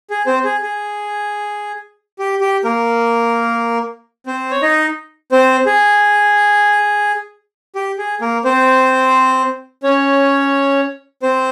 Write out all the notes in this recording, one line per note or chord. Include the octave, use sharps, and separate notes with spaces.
G#4
C4 C5
G#4
G#4
G4
G4
A#3 A#4
C4 C5
C#5
D#4 D#5
C4 C5
G#4
G4
G#4
A#3 A#4
C4 C5
C#4 C#5
C4 C5